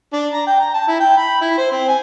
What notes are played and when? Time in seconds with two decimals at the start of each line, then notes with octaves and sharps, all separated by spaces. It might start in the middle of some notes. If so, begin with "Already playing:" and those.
0.13 D4
0.34 A#5
0.47 G5
0.60 A#5
0.74 A5
0.88 E4
1.00 G5
1.17 B5
1.41 E4
1.58 C5
1.71 C4
1.88 G#5